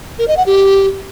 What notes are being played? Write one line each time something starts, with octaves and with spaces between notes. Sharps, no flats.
A#4
D#5
F#5
G4